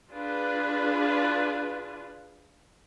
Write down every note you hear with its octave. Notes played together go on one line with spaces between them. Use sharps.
D4 F4 G#4 B4